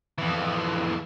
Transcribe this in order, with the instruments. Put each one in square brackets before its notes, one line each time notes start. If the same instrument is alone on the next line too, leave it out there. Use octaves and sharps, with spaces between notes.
[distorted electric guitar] F2 E3